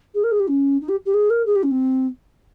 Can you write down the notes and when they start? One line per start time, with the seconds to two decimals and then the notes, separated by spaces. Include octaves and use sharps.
0.14 G#4
0.23 A#4
0.31 G#4
0.39 G4
0.47 C#4
0.81 D#4
0.88 G4
1.05 G4
1.14 G#4
1.30 A#4
1.46 G#4
1.55 G4
1.63 C#4
1.71 C4